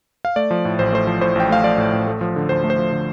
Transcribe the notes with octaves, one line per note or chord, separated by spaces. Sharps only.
F5
A3 D5
F3
A2
A1 C5
A3 C5
F3
A2 C5
A1 G5
A3 F5
F3 D5
A2
A1
A3
F3
D3
D2 C5
A3
C5
F3
D3